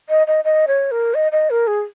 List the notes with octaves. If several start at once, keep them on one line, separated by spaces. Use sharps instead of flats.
D#5
D#5
D#5
C#5
A#4
D#5
D#5
A#4
G#4